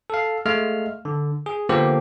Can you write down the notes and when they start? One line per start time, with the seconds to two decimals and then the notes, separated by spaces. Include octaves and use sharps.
0.10 A4 F5
0.46 G#3 A3 F5 F6
1.05 D3
1.46 G#4
1.69 D3 F3 A#3 B3 G4 C5